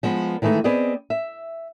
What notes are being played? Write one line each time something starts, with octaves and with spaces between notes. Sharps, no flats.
F3 G#3 B3
D#3 E3 G#3 A3 D#4
B3 C4 G#4 D5 D#5
E5